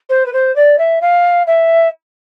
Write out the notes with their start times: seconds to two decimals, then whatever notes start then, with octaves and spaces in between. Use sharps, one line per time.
0.09 C5
0.26 B4
0.33 C5
0.56 D5
0.78 E5
1.01 F5
1.47 E5